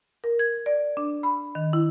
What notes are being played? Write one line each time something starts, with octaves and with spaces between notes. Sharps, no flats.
A#4
G#6
D5
D4
B5
D#3
E4